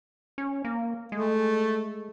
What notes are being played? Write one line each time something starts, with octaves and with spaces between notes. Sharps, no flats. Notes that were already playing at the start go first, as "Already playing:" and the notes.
C#4
A#3
G#3 A3